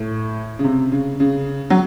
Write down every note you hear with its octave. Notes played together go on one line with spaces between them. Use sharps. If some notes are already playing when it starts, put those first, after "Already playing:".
Already playing: A2
C#3
C3
C#3
C#3
F#3